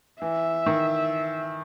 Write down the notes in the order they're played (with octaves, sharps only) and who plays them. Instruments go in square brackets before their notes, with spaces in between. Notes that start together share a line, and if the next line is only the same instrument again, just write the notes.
[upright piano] E3 [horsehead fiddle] E5
[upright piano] D#3